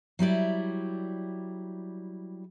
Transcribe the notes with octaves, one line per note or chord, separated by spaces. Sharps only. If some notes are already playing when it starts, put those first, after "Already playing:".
F#3 G3 E4 D5